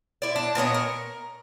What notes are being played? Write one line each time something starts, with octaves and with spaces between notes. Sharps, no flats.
E4 D5
D4
A#2 B3 C#5 D#5
A#4